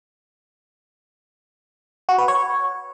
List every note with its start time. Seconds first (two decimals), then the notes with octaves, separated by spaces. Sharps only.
2.09 F#4
2.18 B4
2.28 C#5